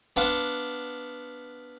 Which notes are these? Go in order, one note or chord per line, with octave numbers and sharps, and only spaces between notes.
B3 D4 F5 F#5 C6